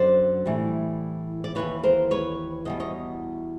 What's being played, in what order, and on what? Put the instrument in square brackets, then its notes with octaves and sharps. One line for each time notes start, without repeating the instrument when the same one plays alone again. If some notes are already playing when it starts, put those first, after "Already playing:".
Already playing: [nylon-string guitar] F#2 D3 F#3 C5 D5
A2 E3 G3
D5
D#2 C#3 E3 B4 C#5
A#4 C5
B4 C#5
E2 B2 G3 D#5
C#5 D#5